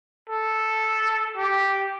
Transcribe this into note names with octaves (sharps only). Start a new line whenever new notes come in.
A4
G4